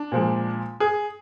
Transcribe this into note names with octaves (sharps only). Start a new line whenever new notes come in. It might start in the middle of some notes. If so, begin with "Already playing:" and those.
Already playing: D4
A#2 F3 G#3
G#4